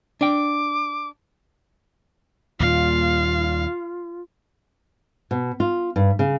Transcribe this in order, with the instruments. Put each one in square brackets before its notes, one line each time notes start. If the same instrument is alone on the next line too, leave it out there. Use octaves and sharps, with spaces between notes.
[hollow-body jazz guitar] D4 G5 [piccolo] D6
[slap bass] D#2 A#2 G3 [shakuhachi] F4 [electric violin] F5
[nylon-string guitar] B2
F4
G2
C#3